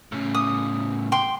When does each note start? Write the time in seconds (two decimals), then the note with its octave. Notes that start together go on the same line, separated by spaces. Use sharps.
0.12 A2 C#3
0.35 D#6
1.12 G5 C6